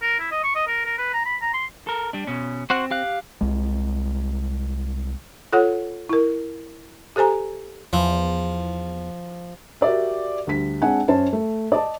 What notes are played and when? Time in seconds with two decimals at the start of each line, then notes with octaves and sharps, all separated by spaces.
0.02 A#4
0.19 E4
0.31 D#5
0.44 C#6
0.56 D#5
0.67 A#4
0.85 A#4
0.98 B4
1.13 A#5
1.25 B5
1.42 A#5
1.53 C6
1.87 A4 A#4
2.13 G3 D4
2.27 B2 C#4
2.70 C4 F#4 C5 F#5
2.91 G4 F5 F#6
3.41 C2 G#3
5.53 F4 A4 C#5 F#5
6.09 E4 A#4
7.16 G4 A4 C5 G#5 A#5
7.93 E2 F3
9.81 F#4 G4 A#4 D5 E5
10.47 D2 G3 B6
10.82 G#3 C4 D4 F#5 G#5
11.08 F#2 C#4 C5 A5
11.33 A3
11.72 D5 D#5 A5